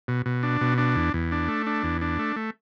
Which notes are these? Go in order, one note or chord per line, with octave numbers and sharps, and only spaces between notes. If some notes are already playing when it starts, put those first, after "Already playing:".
B2
B2
D4
B2
D4
E2
E2
D4
A3
D4
E2
D4
A3
A3